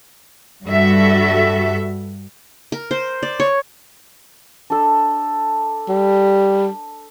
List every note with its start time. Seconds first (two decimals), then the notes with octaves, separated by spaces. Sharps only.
0.64 G2 G3 F#4 A4 E5
2.72 A#4
2.91 C5
3.23 D5
3.40 C#5
4.70 D4 A4
5.89 G3